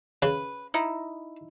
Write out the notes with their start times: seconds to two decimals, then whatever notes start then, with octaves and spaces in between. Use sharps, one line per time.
0.22 C#3 B4
0.74 D#4 E4